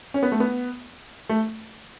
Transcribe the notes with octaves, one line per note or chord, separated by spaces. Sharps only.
C#4
B3
A3
B3
A3